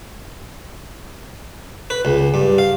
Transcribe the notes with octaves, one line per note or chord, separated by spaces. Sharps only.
B4
C#2
G2
F5